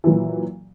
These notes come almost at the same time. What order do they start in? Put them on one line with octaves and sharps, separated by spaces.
E3 F#3 A#2